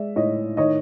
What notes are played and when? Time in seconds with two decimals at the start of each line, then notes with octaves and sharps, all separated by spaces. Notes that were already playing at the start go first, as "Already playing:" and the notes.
Already playing: G#3 D5 E5
0.16 A2 C#5 D#5
0.57 D#3 C#5 D#5